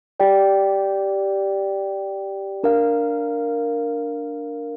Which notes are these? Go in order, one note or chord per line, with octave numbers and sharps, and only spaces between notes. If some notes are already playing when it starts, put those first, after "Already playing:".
G4 D5 G5
D4 A#4 F5